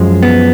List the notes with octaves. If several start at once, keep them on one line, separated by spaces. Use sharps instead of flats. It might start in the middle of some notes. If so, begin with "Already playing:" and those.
Already playing: F#2 F3 G#3
B3